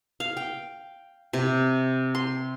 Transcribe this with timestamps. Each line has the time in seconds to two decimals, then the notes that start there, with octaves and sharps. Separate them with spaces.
0.20 F5
0.37 G5
1.33 C3
2.15 C6